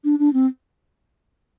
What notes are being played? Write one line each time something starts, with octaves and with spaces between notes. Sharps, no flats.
D4
D4
C4